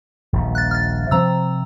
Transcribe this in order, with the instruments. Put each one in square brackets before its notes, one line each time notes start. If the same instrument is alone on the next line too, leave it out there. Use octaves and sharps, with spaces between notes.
[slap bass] D#1 A#1
[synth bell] F#6 A6
F6 A6
[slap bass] C3 C4 [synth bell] F3 A#5 E6